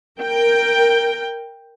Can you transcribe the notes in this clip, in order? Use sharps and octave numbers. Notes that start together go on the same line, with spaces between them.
A#4 G5